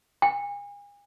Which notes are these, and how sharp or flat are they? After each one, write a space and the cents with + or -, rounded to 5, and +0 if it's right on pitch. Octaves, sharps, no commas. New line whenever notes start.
G#5 -35